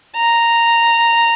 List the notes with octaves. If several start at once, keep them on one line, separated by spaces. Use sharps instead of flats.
A#5